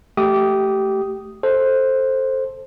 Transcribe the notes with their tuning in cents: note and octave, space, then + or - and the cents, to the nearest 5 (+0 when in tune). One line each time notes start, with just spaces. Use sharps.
A3 -5 G4 -15 D#6 +0
A4 +0 C5 +10